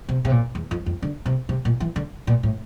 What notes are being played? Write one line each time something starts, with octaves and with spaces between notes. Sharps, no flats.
C3
C3
A#2
E2
F2
F2
D3
C3
C3
A#2
E3
D3
A#2
A2